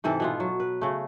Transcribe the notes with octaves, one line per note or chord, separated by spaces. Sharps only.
G#2 C3 E3 A4
B2 B3 F4
F#3
B4
C#3 A3